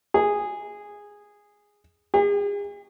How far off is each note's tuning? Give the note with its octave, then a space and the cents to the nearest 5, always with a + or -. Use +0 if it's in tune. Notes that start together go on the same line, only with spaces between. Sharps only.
G#4 -10
G#4 -40